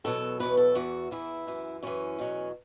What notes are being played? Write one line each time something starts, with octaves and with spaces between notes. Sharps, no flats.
E2 B2 F#3 A4
E2 B2 F#3 B4
A4
E2 E3 F#4
E2 E3 E4
F#2 E3
F#2 E3 C#4
E2 B2 F#3